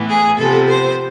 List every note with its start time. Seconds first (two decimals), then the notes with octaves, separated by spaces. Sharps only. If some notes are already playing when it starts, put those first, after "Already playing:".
Already playing: A2 E3 B3
0.09 G#4
0.38 C3 F3 B3 A4
0.69 C5